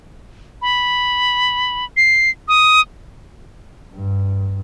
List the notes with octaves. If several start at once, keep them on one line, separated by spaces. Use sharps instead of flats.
B5
C7
D#6
G2